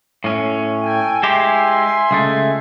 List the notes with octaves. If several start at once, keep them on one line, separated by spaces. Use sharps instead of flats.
A2 C#4
A4 G5 G#5
G#3 E4 G4 E5 G#5 C6
C#2 G#3 A3